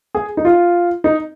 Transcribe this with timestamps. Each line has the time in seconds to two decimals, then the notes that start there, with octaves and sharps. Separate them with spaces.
0.15 G#4
0.37 D#4
0.45 F4
1.04 D#4